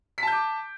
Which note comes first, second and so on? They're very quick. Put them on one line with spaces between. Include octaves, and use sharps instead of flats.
B6 A5 G6 D6